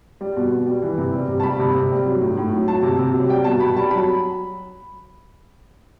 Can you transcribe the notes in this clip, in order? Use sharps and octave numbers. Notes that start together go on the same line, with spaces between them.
G3
B2
B2
G3
E3
C3
G3
C3
A5
G3 B5
C3
C3
G3
F#3
A2
A2
F#3
F#3 A5
C3
C3
F#3
G3 G5
B2 A5
B2 B5
G3 A5
F#3 B5